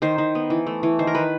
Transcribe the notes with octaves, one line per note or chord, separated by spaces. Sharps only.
D#3 C5
D#3
B3
E3
A3
E3
D#3 C5
A#4
D#3 B4